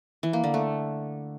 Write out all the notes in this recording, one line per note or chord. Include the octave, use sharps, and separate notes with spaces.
E3
A#3
D3
A3